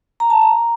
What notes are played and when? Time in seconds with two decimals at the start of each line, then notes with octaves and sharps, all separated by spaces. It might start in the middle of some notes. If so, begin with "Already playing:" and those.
0.20 A#5
0.30 A5
0.42 A#5